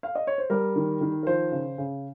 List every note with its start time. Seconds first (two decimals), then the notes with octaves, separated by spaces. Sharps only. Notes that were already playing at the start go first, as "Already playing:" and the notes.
0.03 F5
0.15 D#5
0.27 C#5
0.38 C5
0.50 G3 A#4
0.76 D#3
1.01 D#3
1.23 A#4
1.27 F3 C5
1.52 C#3
1.78 C#3